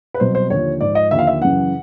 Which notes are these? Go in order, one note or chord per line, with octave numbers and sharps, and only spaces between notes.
B4
C2 B2 F#3 C5
C5
D#2 D3 F3 C#5
G#2 F3 D5
D#5
D#2 D3 F3 E5
F5
E5
F#2 C#3 E3 F#5